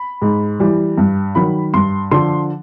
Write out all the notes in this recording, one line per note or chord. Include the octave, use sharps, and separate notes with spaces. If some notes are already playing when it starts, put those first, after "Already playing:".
Already playing: B5
G#2
E3 G3
G2
D#3 F#3 B5
G2 C6
D3 F3 C6